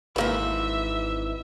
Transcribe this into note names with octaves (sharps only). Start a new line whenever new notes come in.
G#1 F2 G#2 E3 A#3 B4 E5